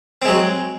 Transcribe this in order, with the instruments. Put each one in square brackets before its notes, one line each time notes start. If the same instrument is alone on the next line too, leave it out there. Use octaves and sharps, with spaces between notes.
[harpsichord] C4
G#3
F#3